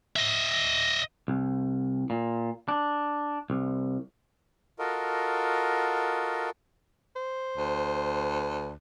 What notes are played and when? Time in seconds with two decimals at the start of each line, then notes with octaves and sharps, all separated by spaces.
0.16 D#5 E5
1.28 C2
2.10 A#2
2.68 D4
3.50 C2
4.79 F4 F#4 A4 A#4 D#5
7.16 C5
7.57 D2